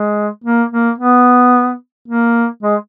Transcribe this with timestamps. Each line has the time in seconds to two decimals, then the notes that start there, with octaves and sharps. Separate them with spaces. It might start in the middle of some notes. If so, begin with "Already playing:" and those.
Already playing: G#3
0.44 A#3
0.71 A#3
0.98 B3
2.08 A#3
2.63 G#3